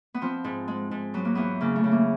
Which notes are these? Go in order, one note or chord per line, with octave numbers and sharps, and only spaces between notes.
B3
F3 C4
G#2
G#3
G#2
F#3 B3
A#3
E2 B3
C#3 A#3
A3
C#3
A#3